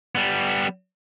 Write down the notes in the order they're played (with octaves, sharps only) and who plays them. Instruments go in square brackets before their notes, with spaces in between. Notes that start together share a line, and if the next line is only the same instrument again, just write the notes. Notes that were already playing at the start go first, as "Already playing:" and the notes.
[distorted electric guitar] G3 B3